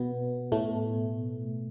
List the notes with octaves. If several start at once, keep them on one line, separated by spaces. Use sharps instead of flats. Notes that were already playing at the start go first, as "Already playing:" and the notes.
Already playing: B2 B3
A2 A3